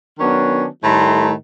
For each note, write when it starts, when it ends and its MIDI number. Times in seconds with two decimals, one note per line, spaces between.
0.19 0.65 51
0.19 0.65 54
0.19 0.65 59
0.19 0.65 61
0.19 0.65 62
0.82 1.31 45
0.82 1.31 51
0.82 1.31 55
0.82 1.31 57
0.82 1.31 82
0.82 1.31 84